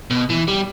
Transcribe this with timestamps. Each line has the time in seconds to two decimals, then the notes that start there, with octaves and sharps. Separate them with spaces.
0.11 B2
0.30 E3
0.48 G3